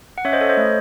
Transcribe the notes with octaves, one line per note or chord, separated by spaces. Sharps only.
F#5
C#4 C#5 E5
C5 D#5
A4 C#5
C5 D#5
A3